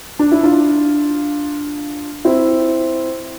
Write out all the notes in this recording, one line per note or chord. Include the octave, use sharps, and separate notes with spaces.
D4
E4
D4 F4
C4 E4